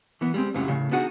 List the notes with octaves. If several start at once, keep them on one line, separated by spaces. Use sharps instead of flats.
E3 B3
G3 G#3 C4
C#2 F#2 A2 F#3 G3 C#4
A2 C#3
B3 D4 D#4 F#4 G#4 F#5